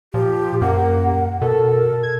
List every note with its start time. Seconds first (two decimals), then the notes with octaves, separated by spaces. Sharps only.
0.14 A#2 F3 G4
0.62 F#2 A#3 F#5
1.41 B2 A4 A#4
2.03 G#6